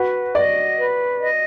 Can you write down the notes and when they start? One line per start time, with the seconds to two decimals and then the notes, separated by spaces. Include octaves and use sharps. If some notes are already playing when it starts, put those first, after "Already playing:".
Already playing: F#4 B4
0.34 D5 D#5
0.78 B4
1.21 D#5